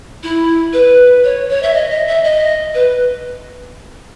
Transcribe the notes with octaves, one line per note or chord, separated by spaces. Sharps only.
E4
B4
C#5
C#5
E5
D#5
D#5
E5
D#5
B4